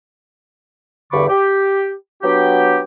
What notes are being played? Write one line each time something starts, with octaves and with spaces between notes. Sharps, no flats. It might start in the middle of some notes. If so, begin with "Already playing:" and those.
E2 G2 D3 B5 C#6 D6
G4
F#3 B3 D4 G4